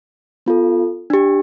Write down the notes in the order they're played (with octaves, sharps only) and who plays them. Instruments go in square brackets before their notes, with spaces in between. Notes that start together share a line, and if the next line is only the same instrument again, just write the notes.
[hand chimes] B3 F4 A4
D4 G4